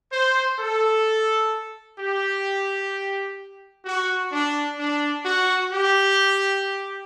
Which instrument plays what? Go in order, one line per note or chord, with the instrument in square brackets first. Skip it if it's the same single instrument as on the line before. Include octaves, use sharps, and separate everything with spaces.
[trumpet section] C5
A4
G4
F#4
D4
D4
F#4
G4